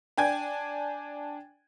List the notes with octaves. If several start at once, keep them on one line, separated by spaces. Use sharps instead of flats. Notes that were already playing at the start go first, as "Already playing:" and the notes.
D4 G5 G#5 G#6